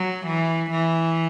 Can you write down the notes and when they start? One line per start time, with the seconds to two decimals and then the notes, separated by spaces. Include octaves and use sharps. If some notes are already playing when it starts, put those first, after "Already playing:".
Already playing: F#3
0.27 E3
0.71 E3